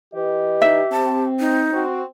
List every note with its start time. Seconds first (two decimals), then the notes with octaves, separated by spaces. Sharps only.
0.14 E3 G4 B4 D#5
0.62 D#4 E5
0.92 C4 A5
1.40 D#4
1.73 C4 F#4